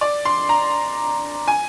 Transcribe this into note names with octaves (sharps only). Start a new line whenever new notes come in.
D5
C6
A#5
G#5